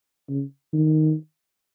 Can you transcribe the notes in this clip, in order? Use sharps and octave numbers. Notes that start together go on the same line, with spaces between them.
C#3
D#3